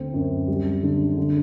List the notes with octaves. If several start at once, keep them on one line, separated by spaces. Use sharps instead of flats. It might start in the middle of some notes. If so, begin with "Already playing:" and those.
Already playing: D2 C4
F#2
G3
D3
D3